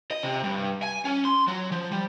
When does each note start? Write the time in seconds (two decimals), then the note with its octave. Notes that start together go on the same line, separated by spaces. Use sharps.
0.11 D#5
0.23 C3
0.44 G2
0.82 G#5
1.05 C#4
1.25 C6
1.48 F#3
1.72 F3
1.91 G3